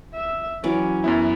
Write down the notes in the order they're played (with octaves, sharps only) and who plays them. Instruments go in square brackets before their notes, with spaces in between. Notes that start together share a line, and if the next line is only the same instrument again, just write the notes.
[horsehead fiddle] E5
[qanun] E3 D5 [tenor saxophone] F#3 [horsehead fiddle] C#4
[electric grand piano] F#2 B3 E4